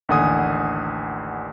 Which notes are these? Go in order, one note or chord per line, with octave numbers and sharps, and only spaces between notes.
A1 D#2 D3 F#5 G#5 D#6